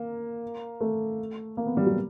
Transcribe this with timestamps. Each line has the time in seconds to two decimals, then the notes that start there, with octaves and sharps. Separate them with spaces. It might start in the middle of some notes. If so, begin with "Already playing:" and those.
Already playing: A#3
0.81 A3
1.57 A#3
1.66 B3
1.77 G3
1.86 F#3